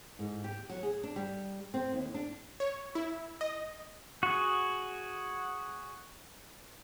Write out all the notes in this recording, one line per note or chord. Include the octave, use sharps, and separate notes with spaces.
G#2
G4
F#3
G#4
D4
G3
C4
D#2
D4
C#5
E4
D#5
F#4 G#4